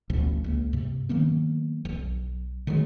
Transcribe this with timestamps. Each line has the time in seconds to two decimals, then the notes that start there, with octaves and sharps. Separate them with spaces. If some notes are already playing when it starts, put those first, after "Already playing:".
0.10 A1 D2 B2 F3
0.44 C#2 A#3
0.73 G2 C3
1.09 D#3 F#3 A#3 B3
1.85 D1 B1
2.67 D3 D#3 F#3 G#3